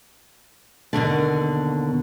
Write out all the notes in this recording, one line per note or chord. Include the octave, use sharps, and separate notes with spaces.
D#2 G#2 B2 D3